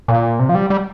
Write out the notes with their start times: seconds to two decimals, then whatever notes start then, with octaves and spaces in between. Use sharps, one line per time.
0.08 A#2
0.39 C3
0.49 F3
0.55 G3
0.70 G3